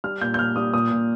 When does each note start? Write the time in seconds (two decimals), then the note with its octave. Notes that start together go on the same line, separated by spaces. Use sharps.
0.04 G3 F6
0.21 A#2 G6
0.34 G6
0.38 A#2 F6
0.56 G3 D#6
0.73 A#2 D#6
0.91 A#2